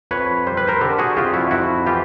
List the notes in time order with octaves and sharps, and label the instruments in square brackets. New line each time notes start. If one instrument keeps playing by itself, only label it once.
[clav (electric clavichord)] F2 B4 C#5
G3 C5
B4
A#4 C5
D3 G4 A4
F#4 G#4
F2 F4 G4
E4 F#4
F2 E4 F#4
E3 F4 G4